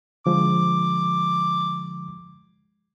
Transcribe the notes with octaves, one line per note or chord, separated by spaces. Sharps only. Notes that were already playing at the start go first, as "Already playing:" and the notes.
D3 F3 G#3 D6